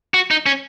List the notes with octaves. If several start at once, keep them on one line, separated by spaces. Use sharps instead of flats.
F#4
D#4
C#4